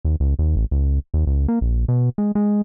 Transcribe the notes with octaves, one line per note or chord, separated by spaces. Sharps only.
D#2
C#2
D#2
A1
C#2
D#2
C#2
A#3
A#1
B2
G#3
G#3